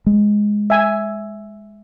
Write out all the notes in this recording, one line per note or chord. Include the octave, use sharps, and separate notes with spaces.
G#3
E5 G#5